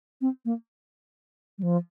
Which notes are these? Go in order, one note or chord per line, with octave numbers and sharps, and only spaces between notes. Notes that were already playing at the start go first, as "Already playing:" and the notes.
C4
A#3
G3
F3